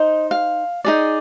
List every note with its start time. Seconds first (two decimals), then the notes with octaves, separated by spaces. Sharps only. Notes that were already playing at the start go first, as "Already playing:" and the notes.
Already playing: D#4 C5 D#5
0.31 F5
0.85 D#4 G#4 D5